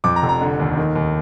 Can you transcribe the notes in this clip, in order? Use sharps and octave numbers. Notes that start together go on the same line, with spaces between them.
F2 D6
A#5
F1
A#5
D3
D#2
D#3
D#2